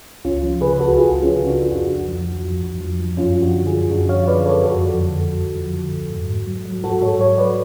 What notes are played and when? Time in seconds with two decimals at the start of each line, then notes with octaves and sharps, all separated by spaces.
0.24 C#2 C#4 F4
0.43 F3
0.61 C#3 G#4 B4
0.73 B4
0.80 C#2 F#4 A4
0.98 C#2 F4 G#4
1.17 F3
1.23 C#4 F4
1.35 C#3
1.46 D4 F#4
1.52 C#2
1.61 F4
1.71 F2 D4 F#4
1.90 F2
2.08 F3
2.26 F3
2.44 F2
2.62 F2
2.80 F3
2.99 F3
3.17 F#2 C#4 F4
3.36 F3
3.41 D4 F#4
3.54 D3
3.66 F4 G#4
3.72 F#2
3.90 F#2 D4 F#4
4.09 F3 C#5 F5
4.27 D3 B4 D5
4.46 F#2 A4 C#5
4.63 F2 F#4 A4
4.82 F3
5.01 D3
5.19 F2
5.37 F2
5.55 F3
5.73 D3
5.93 F2
6.10 G#2
6.28 G#2
6.47 F#3
6.66 F#3
6.84 G#2 F#4 A4
7.01 G#2 A4 C#5
7.20 F#3 A4 C#5
7.38 F#3 B4 D5